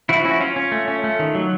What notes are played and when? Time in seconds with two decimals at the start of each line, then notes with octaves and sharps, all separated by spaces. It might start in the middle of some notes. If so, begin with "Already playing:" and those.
0.09 F3 E4 F#4
0.25 C#4 E4 F#4
0.40 C#4 F4
0.56 C#4
0.72 A3
0.88 C#4
1.04 A3
1.19 D#3
1.35 F#3